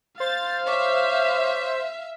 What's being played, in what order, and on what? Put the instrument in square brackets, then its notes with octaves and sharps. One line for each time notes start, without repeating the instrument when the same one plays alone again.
[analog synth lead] C5 [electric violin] F5 [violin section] A6
[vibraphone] C#5 C#6 D6 [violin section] E5